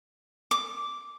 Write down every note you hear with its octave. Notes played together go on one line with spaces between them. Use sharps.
D6